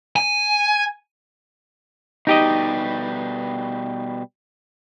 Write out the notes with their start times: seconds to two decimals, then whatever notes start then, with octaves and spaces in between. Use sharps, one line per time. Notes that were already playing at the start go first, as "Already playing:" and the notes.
0.16 G#5
2.27 B2 G3 D#4 G4 D#5